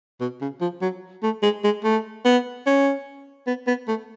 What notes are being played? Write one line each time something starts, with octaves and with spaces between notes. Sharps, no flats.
B2
C#3
F3
F#3
A3
G#3
G#3
A3
B3
C#4
B3
B3
A3